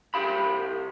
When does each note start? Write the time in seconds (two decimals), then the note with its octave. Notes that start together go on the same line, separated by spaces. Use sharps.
0.14 C2 G4 F5 B5